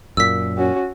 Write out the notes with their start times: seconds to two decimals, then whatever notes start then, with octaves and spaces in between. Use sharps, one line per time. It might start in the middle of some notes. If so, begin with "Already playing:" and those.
0.17 F#2 A#2 E6 B6
0.58 C#4 F#4